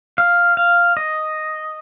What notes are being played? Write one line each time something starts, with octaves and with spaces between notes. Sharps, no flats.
F5
F5
D#5